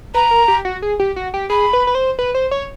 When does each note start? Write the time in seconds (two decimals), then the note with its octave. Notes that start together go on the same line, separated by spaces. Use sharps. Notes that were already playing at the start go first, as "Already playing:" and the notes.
0.14 B4 A#5
0.31 A#4
0.48 G4
0.65 F#4
0.82 G#4
1.00 G4
1.16 F#4
1.34 G4
1.50 G#4 B5
1.73 B4
1.87 B4
1.95 C5
2.19 B4
2.35 C5
2.51 C#5